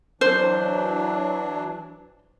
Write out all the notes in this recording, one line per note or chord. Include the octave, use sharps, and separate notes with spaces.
E3 F#3 D4 C5